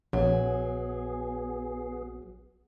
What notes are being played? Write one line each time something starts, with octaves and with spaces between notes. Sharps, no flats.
A#1 F#3 B3 G#4